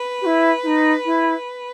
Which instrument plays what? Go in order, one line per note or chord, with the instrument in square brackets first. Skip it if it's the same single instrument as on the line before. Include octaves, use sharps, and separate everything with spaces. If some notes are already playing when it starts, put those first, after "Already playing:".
Already playing: [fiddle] B4
[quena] G4
E4
E4
D#4
E4